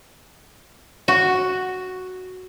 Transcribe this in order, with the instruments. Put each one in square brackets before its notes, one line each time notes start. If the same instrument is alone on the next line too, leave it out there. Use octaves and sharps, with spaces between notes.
[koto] F#4